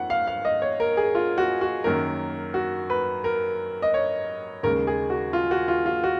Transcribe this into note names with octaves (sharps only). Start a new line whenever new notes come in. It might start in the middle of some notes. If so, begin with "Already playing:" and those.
Already playing: F2 D#3 F#5
F5
F5
D#5
C#5
A#4
G#4
F4
F#4
F#4
F#2 D#3 F#3 A#3 A#4
F#4
B4
A#4
D#5
C#5
D#2 C#3 G#3 A#4
G#4
F#4
F4
F#4
F4
F4
F#4